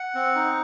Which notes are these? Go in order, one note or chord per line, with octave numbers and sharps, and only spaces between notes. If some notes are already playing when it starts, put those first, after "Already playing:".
Already playing: F#5
C4
D#4